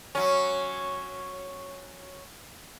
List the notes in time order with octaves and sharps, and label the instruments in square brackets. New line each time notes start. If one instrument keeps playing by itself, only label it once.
[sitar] F#3 C#4